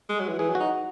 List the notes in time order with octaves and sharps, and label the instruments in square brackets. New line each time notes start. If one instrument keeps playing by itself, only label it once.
[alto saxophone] G#3
F#3
E3
[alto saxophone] E3 [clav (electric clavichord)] G#4
[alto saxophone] F#3
[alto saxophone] D#4 [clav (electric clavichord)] F#4